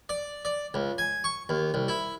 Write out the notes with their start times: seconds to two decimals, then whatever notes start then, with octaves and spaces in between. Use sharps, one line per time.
0.09 D5
0.45 D5
0.74 C#2
0.98 G#5
1.24 C#6
1.49 D#2
1.74 C2
1.88 E4